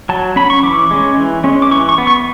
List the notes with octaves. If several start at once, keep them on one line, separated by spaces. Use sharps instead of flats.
F#3 A5
C#4 B5
C#6
E3 D6
G#3 C#4
E3
G#3 C#4
D6
E3 C#6
C#6
B3
C#6